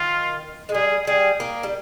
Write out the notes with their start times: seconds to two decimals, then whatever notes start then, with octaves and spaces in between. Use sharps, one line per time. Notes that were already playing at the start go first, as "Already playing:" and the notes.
Already playing: D#3 F4
0.69 G#3
0.74 G3 G#4
1.07 G3 G#4
1.40 A#3
1.63 G3